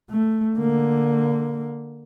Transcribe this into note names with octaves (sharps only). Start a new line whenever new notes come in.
A3
D3 A#3